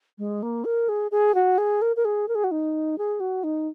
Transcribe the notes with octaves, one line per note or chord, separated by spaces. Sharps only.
G#3
A#3
A#4
G#4
G#4
F#4
G#4
A#4
A#4
G#4
A#4
G#4
F#4
D#4
G#4
F#4
D#4